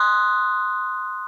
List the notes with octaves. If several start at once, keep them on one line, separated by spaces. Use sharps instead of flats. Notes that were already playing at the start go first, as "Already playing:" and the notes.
Already playing: C6 D#6 F#6